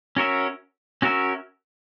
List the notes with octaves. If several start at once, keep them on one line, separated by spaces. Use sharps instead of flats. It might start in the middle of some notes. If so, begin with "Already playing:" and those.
C#4 F#4 A#4 C#5 E5
C#4 F#4 A#4 C#5 E5